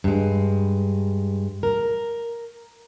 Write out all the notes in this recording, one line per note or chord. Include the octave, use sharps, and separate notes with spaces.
G2 G#3
A#4